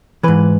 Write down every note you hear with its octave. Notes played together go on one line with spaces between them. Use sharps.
G#2 E3 B4